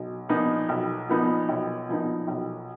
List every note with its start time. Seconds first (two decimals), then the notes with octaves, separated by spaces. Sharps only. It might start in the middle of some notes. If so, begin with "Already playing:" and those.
Already playing: B1
0.29 A#2 F3 B3 D#4
0.69 B1
1.09 A#2 F3 B3 D#4
1.49 B1
1.89 A#2 F3 B3 D#4
2.28 B1